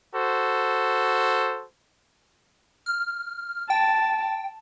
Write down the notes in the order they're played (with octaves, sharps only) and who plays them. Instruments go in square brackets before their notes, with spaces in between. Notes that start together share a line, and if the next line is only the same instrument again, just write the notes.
[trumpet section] F#4 A4 C5
[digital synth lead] F6
[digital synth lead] G5 [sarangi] A5